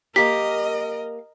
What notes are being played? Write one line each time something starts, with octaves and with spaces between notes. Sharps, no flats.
A#3 G4 A#4 D#5 B6